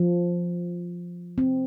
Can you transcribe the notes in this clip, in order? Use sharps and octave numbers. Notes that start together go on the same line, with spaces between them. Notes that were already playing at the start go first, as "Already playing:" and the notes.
Already playing: F3
C4